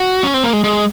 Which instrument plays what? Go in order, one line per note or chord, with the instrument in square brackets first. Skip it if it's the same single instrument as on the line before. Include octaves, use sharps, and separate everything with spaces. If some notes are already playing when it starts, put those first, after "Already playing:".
Already playing: [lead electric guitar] F#4
C#4
C4
A#3
G#3
G#3